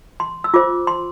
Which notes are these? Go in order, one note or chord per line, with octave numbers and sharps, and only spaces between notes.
C6
E6
F4 C5 D6
C6